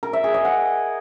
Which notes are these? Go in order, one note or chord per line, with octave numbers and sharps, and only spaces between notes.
A#4
E5
G#4
D#5
F#5